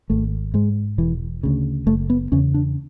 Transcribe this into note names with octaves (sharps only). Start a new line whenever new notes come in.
G#1 A3
G#2 G#3
E1 E3
D2 C#3
F#1 A3
B3
E2 C#3 C#4
D4